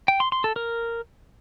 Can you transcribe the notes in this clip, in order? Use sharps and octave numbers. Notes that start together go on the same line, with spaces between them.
G5
C6
C6
A4
A#4